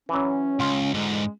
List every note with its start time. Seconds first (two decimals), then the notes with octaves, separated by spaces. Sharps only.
0.09 E3 F#3 C#4
0.60 C#2 F4
0.94 G#2 D3 G#3